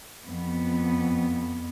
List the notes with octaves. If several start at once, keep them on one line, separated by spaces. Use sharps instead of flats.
F2 B3